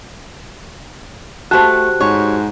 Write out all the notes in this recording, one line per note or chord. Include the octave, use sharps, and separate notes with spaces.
A3 F#4 G4 C5 A5 F#6
G#2 C#5